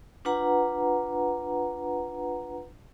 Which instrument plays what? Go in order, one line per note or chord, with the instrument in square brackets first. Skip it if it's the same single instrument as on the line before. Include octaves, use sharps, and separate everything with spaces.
[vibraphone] D4 F4 B4 F#5 A#5